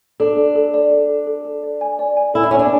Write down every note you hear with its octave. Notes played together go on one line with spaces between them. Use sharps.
D4 A4
A4
A4
D5
A4
A4
A4
A4
D5
G#5
D5
G#5
E4 A4
D4
C#4 G#5
D4